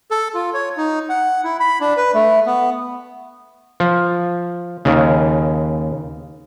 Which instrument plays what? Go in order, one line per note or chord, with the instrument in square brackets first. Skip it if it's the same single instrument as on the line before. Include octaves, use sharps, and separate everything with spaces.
[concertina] A4
F4
C#5
D#4
F#5
E4
B5
D4
B4
A3
B3
[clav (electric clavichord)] F3
D#2 C#3